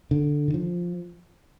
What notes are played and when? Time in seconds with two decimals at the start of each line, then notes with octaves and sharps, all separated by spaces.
0.11 D3
0.48 D#3
0.54 F3